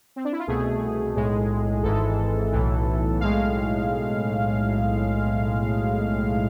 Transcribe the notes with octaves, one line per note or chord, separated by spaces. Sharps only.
C4
D4
E4
F4
C2 B2 A3 G#4
B1 A2 G#3
G#1 G#2 E3 G#3 A4
B1 A2 E3
B1 A2 G#3 F5